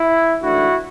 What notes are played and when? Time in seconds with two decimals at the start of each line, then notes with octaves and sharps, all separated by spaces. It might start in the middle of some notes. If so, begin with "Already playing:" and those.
Already playing: E4
0.42 G#2 E3 A3 D4 E4 F#4